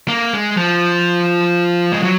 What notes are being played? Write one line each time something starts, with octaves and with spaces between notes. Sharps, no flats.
A#3
G#3
F3
G#3
F#3